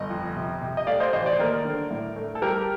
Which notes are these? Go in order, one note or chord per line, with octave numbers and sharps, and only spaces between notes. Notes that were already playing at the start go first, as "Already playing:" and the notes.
Already playing: G1 D#5
F2
C3
C3
D#5
A3 D5 F5
C5 D#5
A1 C5 D#5
D5
C5
D#2 A#4 D5
D3
A2
A3
A4
G3 G4 A#4